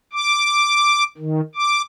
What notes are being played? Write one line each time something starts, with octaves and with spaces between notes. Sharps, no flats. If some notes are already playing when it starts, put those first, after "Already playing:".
D6
D#3
D6